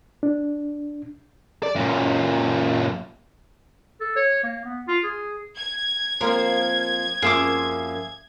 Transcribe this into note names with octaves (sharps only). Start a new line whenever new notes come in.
D4
D5
F#2 A#2
A4
C#5
A#3
B3
F4
G#4
G#6
F3 A#3 C4 A#4
F#2 F3 A#3 G#4 E5 D6